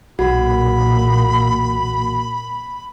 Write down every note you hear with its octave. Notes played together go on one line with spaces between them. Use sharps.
B1 E2 A#2 F#4 B5